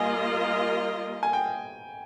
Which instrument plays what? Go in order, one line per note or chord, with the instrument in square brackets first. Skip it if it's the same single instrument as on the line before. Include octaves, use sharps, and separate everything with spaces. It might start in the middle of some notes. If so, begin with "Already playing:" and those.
Already playing: [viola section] G3 A#3 F4 A#4 D#5 [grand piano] G#5
[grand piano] G#5
G5